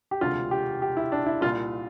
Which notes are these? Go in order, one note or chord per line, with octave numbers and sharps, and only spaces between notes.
G4
E1 D2 C3 F4
G4
G4
E4
D4
E4
C2 A#2 F4